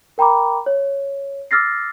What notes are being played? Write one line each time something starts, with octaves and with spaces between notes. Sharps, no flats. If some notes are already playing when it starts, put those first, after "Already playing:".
A#4 G5 A#5 B5 D6
C#5
D6 E6 F6 A6 A#6 C7